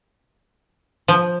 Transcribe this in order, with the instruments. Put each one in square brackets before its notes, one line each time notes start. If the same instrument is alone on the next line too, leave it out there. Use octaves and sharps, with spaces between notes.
[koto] F3